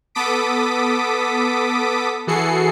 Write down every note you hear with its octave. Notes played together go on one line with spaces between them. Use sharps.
B3 A4 D6 D#6 B6 D7
E3 F#4 G#4 A4 C7 C#7